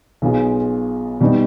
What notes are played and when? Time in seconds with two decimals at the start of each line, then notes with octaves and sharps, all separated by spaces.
0.22 B1 B2 B3 F4 G#4
1.21 B2 G3 B3 D#4